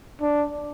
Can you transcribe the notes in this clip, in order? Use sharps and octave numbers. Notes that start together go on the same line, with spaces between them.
D4